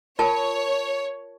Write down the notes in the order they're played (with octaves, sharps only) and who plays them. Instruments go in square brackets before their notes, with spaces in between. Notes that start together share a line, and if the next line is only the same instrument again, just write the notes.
[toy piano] F4 A#4 A5 [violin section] C#5